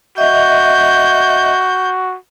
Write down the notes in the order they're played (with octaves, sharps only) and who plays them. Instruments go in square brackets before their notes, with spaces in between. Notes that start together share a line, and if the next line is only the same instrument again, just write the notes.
[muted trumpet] F#4 [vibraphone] D#5 E5 [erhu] G6